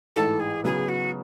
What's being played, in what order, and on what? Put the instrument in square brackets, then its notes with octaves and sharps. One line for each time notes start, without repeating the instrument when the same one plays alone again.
[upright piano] A1 G#2 E3 [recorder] A4
[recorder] G#4
[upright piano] C#3 F#3 B3 [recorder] G#4
[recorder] F#4